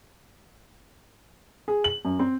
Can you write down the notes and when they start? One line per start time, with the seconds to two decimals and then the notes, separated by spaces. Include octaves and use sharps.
1.68 G#4
1.84 F#7
2.05 F#2
2.19 C4